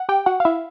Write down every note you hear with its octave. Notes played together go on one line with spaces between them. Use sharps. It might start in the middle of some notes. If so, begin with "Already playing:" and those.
Already playing: F#5
G4 G5
F#4 F#5
F5
E4 E5